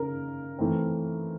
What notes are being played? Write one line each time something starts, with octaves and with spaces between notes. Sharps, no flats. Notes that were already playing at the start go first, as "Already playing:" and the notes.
Already playing: C#3 A#4
E3 A3 C4